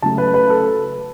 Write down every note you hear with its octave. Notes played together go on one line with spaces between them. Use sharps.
C#3 F#3 A3 A5
B4
B4
A4